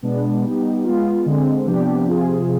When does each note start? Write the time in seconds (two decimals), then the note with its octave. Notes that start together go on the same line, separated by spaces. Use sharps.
0.03 B2 G#3 B3 D4
0.44 G3 B3 D#4 G4
0.84 G#3 B3 F4
1.26 D3 G#3 C4
1.66 C3 F3 B3 D4 G4
2.07 C3 F3 C4 F4 G#4